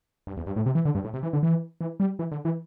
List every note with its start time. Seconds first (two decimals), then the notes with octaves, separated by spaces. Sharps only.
0.27 G2
0.37 E2
0.47 G2
0.56 A2
0.66 C3
0.75 E3
0.85 D3
0.95 G2
1.04 A2
1.14 C3
1.23 E3
1.33 D3
1.43 E3
1.81 E3
2.00 G3
2.19 E3
2.32 D3
2.45 E3